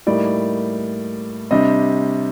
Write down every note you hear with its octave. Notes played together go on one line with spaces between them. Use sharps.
A2 G3 A#3 D#4 D5
C3 G3 D4 D#5